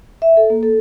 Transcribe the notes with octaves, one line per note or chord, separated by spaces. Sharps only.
E5
A4
A#3
A4